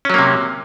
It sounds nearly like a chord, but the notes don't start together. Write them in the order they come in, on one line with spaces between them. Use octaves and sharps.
C#4 F#3 A#3 C3